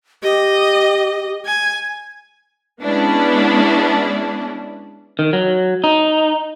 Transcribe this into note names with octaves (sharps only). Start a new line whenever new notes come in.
G4 D#5
G#5
G#3 B3 C#4 D4 E4
D#3
F#3
D#4